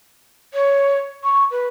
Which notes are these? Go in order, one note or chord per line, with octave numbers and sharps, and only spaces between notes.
C#5
C#6
B4